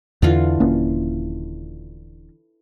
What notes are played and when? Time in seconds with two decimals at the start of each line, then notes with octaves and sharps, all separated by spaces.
0.22 E2 D3 E3 F4
0.60 D#1 A#3 C#4